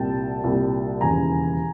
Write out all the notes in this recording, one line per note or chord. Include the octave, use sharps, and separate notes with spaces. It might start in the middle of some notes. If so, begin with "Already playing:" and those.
Already playing: C2 A#2 G3 G5 A5
C2 A#2 G3
E1 D#2 C#3 E3 G3 G#5 A#5